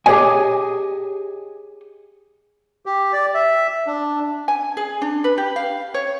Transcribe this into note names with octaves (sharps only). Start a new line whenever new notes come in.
G4 G#4 B4 C#5 D#5 G#5
G4
D5
E5
D4
G#5
G#4
D4
B4
G4
F5
C#5